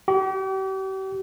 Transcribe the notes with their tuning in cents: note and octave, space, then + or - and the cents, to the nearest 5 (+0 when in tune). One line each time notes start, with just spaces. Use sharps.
G4 -40